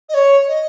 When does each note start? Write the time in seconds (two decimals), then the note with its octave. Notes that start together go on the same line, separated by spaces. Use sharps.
0.09 D#5
0.14 C#5
0.47 D#5